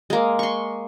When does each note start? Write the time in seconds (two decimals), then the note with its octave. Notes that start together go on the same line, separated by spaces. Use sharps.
0.10 G#3 A#3
0.39 C6 C#6